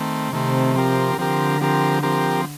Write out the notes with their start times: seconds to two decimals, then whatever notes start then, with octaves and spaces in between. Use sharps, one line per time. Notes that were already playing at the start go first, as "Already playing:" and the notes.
Already playing: D#3 A3 C4
0.33 C3 D#3 A3 C4
0.76 F3 C4 G4 A#4
1.19 D3 F3 C4 G4 A#4
1.61 F3 C4 G4 A#4
2.03 F3 C4 G4 A#4